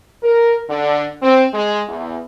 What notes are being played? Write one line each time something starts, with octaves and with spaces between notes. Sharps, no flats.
A#4
D3
C4
G#3
E2